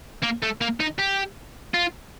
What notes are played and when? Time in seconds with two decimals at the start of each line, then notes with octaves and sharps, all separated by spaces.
0.23 A#3
0.43 A3
0.61 A#3
0.80 D#4
0.99 G4
1.74 F4